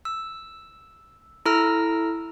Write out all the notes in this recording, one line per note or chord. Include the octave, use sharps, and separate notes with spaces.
E6
E4 A4 A#5 E6 F6 A#6